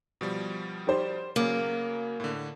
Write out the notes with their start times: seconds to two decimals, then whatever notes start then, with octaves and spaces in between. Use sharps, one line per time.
0.21 B2 F3 G3
0.87 G4 C5 D5
1.36 C#3 F#3 A#3 D6
2.20 A2 D3